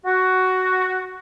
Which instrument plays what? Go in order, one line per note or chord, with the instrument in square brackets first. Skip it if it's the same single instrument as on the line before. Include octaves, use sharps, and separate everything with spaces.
[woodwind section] F#4